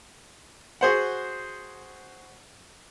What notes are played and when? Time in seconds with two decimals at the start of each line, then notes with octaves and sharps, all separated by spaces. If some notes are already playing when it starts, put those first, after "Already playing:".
0.81 F#4 G#4 C5 F#5